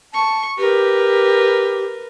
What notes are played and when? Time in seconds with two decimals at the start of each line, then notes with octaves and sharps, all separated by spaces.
0.14 A5 C#6
0.58 G4 A#4 B4